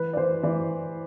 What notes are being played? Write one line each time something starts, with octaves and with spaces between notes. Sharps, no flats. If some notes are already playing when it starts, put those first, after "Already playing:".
Already playing: E3 B4
D5
E3 C5
E3 D5